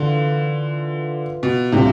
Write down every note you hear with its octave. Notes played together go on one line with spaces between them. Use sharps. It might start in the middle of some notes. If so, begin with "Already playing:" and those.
Already playing: D3 E3 F4
B2
A2 C3 G3 D4 F4